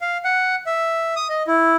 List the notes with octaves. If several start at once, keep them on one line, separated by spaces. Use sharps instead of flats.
F5
F#5
E5
D#6
D#5
E4